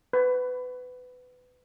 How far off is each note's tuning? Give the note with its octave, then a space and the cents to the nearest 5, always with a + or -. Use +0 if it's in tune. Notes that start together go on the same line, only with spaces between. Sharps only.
B4 +25